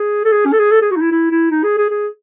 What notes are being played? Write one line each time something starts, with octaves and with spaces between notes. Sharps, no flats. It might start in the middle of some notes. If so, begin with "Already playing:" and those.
Already playing: G#4
A4
G#4
C#4
A4
G#4
A4
G#4
F#4
D#4
E4
E4
E4
D#4
G#4
G#4
G#4